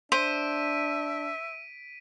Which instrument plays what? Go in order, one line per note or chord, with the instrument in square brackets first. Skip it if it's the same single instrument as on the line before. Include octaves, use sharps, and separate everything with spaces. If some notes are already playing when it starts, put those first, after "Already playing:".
[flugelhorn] D4 [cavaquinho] C5 [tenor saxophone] E5 [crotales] B6 D7 D#7